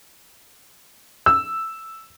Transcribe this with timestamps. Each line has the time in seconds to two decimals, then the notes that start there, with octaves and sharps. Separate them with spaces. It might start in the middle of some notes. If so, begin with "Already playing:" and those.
1.26 E6